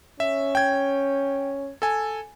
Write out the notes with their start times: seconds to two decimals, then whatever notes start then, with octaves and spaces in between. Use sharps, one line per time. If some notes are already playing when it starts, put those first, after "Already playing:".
0.20 C#4 E5
0.55 G5 G#6
1.82 A4 G#5